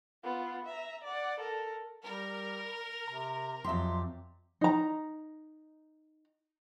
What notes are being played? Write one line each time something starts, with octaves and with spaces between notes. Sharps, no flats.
B3 F4
E5 A#5
D5 F#5
A4 A#4
G3 A#4
C3 A#5
F2 F#3 G4 E5 C6
D#4 A#5